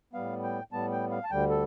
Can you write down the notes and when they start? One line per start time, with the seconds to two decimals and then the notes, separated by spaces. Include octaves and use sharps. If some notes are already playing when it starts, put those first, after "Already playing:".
0.13 A2 G3 B3 F5
0.43 G5
0.72 A2 G3 B3 A5
0.92 G5
1.11 F5
1.24 A5
1.30 D2 D3 G3 G5
1.50 A4